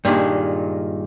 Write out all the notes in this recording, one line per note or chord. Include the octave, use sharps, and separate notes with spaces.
G2 A#2 D#3 G#3